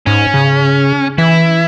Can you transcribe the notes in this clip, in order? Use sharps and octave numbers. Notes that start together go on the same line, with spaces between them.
G#2 C#4
C#3
E3 E4